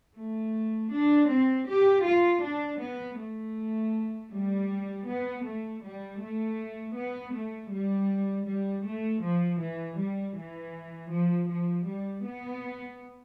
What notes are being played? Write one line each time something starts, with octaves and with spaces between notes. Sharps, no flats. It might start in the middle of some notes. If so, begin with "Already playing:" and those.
A3
D4
C4
G4
F4
D4
B3
A3
G3
B3
A3
G3
A3
B3
A3
G3
G3
A3
F3
E3
G3
E3
F3
F3
G3
B3